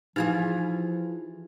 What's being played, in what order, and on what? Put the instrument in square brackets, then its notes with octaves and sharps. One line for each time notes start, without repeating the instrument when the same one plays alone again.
[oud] E3 F4 G#4 [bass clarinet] F3 [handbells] D#4 G4 G#6